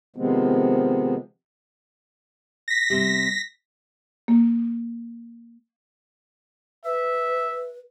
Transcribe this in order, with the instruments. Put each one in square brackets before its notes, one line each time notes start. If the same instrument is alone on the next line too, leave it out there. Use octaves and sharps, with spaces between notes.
[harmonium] C3 D#3 F3 G#3 B3 C4
[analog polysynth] A#6 B6
[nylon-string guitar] C3 G3
[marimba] A#3
[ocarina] B4 [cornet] E5